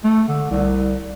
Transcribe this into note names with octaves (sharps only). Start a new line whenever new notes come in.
A3
D3
C2